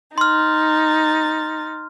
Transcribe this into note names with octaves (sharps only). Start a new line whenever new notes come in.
D#4 C6 F6 A6